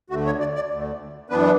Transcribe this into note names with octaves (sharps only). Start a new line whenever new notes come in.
D2 D3 A3 F#4
C#5
D5
D5
D2 D3 A3
F#2 E3 B3 D4 B4